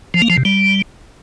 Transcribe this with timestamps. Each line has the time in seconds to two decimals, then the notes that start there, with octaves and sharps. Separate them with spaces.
0.14 F3
0.22 A#3
0.30 F3
0.37 C3
0.45 G3